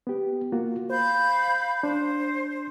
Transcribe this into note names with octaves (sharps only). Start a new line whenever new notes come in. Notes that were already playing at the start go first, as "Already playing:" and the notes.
B3 G4
A#3 F4 F#4
C5 F5 B5 G6
D4 C5